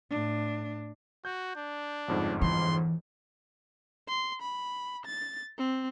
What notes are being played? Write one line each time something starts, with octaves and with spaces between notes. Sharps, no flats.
A2 D4
F#4 G6
D4
G1 F2 G#2
E3 C6
C6
B5
A6
C4